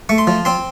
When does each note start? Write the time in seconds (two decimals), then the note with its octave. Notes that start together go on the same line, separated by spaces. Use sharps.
0.09 A3 C#6
0.18 C6
0.27 F3
0.45 C4 C6